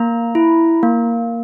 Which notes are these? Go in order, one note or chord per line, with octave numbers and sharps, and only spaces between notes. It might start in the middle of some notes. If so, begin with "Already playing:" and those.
Already playing: A#3 A#5
E4
A#3